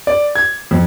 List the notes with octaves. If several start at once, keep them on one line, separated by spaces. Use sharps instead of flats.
D5
G#6
F2